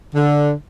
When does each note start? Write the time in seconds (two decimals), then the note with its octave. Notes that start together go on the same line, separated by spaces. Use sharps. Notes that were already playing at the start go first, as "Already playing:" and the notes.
0.13 D3